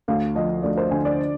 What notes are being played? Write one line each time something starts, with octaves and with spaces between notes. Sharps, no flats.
D2 F5
F3 D#5
D2 D5
C5
D3 G#5
D5